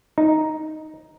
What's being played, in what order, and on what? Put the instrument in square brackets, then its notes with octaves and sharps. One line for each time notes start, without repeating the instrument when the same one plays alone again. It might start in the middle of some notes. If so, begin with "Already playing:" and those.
[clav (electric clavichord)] D#4